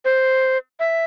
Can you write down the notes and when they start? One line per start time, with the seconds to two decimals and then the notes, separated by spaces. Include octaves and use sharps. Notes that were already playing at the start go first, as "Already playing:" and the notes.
0.05 C5
0.80 E5